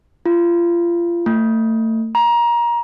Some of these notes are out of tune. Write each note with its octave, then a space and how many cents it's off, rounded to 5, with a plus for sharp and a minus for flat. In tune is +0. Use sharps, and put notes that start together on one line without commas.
F4 -30
A3 +30
A#5 +25